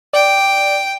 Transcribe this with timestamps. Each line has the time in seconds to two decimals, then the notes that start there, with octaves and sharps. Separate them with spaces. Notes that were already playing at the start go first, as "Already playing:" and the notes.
0.13 D5 G5